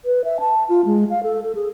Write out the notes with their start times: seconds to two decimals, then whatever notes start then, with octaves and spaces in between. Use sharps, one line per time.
0.05 B4
0.24 E5
0.40 A5
0.69 F4
0.85 G#3
1.10 F5
1.23 A4
1.43 A4
1.55 G#4